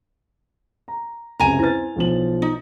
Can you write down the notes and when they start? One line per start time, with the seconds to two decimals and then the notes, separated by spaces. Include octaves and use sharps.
0.88 A#5
1.40 C#2 F#2 C3 G#5 A#5
1.59 C4 E4 B4 A6
1.96 B1 F3 F#7
2.42 D#4